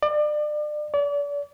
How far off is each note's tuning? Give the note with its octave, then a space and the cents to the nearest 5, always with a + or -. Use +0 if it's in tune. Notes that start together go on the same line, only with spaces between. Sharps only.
D5 +35
D5 -35